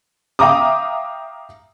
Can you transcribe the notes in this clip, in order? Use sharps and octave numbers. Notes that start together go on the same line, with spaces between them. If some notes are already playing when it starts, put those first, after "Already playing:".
E5 F5 G5 A#5 D6 D#6